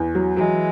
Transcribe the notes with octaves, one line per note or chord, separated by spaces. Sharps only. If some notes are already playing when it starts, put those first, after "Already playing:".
Already playing: E2
F#3
E3 F#3 G#3